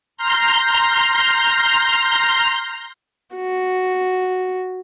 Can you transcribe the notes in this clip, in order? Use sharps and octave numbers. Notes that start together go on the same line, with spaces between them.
A#5 C6 F6 G6
F#4